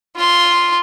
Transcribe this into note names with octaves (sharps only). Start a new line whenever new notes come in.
F4 C6